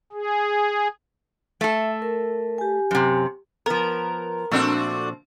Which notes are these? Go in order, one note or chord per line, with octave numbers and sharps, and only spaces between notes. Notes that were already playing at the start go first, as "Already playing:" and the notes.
G#4
A3 A4 E5
A#4
G4 G#5
F#2 C3
F3 B3 A#4
A#2 F3 A3 C4 D4 F#4